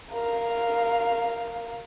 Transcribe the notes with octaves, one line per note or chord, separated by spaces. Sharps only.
A#4 F5